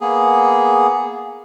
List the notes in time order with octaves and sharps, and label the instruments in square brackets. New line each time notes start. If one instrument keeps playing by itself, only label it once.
[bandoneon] A#3 B3 G#4